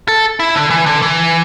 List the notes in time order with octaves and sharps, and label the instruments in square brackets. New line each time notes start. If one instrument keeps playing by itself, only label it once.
[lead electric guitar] A4
E4
D3
E3
D3
E3